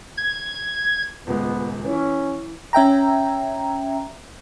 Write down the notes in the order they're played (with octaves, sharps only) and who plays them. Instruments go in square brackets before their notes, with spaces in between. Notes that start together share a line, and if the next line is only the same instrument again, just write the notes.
[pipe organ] G#6
[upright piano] D#1 C#2 G#3 [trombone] B3
[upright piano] E3 E4 [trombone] C#4
[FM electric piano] C#4 E5 G5 A#5